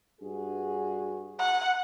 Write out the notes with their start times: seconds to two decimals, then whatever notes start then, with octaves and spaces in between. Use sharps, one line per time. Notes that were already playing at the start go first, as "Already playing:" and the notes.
0.22 G2 F#4 G#4
1.39 F#5